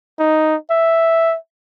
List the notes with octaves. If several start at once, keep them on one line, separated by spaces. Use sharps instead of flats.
D#4
E5